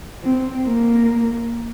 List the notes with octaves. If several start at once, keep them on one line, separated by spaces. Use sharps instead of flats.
C4
A#3